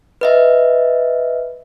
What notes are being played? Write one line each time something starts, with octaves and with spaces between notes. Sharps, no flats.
B4 D#5 E5